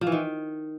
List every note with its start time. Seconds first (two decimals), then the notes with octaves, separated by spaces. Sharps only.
0.01 F3
0.07 E3
0.12 D#3